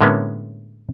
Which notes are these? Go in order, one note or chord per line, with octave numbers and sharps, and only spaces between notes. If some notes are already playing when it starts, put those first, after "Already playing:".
A2 D3 G#3 A#3 B3 C#4